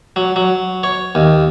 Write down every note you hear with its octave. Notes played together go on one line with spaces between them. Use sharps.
F#3
F#3
C#5
D#2